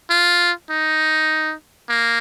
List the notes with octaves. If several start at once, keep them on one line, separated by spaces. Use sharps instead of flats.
F4
D#4
A#3